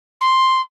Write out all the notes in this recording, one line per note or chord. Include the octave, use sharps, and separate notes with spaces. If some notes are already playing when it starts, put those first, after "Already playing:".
C6